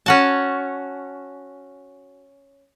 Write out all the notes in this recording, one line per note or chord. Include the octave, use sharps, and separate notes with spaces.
C#4 F#4 A5